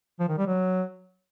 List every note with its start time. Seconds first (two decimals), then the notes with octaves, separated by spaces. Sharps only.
0.20 F3
0.29 D#3
0.38 G3
0.47 F#3